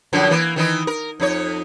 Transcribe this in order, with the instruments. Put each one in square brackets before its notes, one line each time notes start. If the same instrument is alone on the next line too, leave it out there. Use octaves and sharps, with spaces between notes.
[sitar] F#2 D3 F3
E3 A#3
D#3 E3 D#4
A#4
F2 D#4 C#5